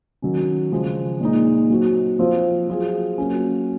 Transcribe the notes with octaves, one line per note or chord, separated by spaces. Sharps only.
D#3 F#3 C#4
C#3 F3 G#3
A#2 G#3 D#4
F#3 C4 F#4
F3 C4 F4
F#3 C4 F4 G#4
F#3 A#3 C#4